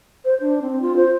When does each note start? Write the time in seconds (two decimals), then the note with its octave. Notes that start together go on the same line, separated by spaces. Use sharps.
0.25 C5
0.41 D4
0.62 C4
0.82 F4
0.97 C5